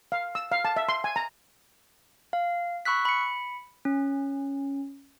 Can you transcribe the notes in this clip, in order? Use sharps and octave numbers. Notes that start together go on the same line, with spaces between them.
F5
E6
F5
A5
E5
C6
G#5
A#5
F5
B5 C#6 E6 F#6 B6
B5 C#7
C#4